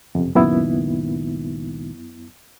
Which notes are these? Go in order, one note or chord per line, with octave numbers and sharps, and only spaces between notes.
F#1 F2 C3
C#2 F#2 A#2 D#3 B3 E4